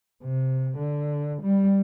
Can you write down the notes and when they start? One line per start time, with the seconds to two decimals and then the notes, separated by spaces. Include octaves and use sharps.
0.24 C3
0.78 D3
1.42 G3